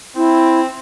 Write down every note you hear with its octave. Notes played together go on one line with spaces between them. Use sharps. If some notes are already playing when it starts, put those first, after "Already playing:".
C4 E4